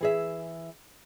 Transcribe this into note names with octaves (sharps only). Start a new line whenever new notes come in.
E3 G#4 E5